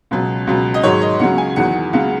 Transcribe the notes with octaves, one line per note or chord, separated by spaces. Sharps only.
C#2 B2 F#3
C#2 B2 F#3
D#5
G#2 D#3 F#3 C#5
D#5
C#2 C#3 F#3 F#5
G#5
E2 D#3 F#3 F#5
C#2 C#3 F#3 F#5